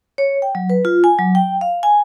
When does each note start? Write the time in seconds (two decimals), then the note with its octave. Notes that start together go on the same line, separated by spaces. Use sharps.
0.18 C#5
0.42 G5
0.55 F#3
0.70 B4
0.85 F4
1.04 G#5
1.19 F#3
1.35 G5
1.61 F5
1.83 G#5